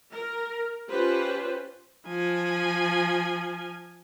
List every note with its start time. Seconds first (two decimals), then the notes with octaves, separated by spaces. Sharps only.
0.12 A#4
0.90 C#4 F4 G4 B4 C5
2.07 F3 G#5